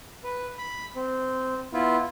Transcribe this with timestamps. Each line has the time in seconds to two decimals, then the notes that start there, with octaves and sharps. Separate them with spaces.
0.24 B4
0.58 B5
0.96 C4
1.73 B3 E4 F4